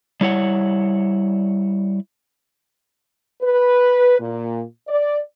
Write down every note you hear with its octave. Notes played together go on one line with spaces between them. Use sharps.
G3 E4 C#5 F#5
B4
A#2
D5